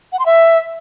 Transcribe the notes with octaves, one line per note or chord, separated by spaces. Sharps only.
F#5
C6
E5